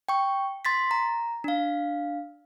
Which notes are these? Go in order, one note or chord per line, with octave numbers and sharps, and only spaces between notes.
G5 C#6
C6 A6 B6
A#5
D4 F5